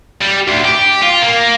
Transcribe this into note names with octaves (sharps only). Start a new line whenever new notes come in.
G3
D2
G4
F4
A#3